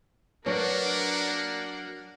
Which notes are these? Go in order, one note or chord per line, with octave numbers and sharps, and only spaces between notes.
F#3 A#3 D4 A#4 B4 C#5 F#5